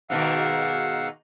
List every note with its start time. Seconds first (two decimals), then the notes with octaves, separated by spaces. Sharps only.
0.10 G#2 B2 D#3 F5 F#5 E6